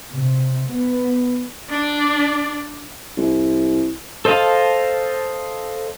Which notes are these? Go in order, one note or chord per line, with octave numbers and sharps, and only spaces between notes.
C3
B3
D4 D5
C2
A4 C5 D#5 F5 A5